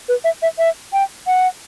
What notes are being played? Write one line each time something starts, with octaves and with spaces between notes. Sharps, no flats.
B4
E5
E5
E5
G5
F#5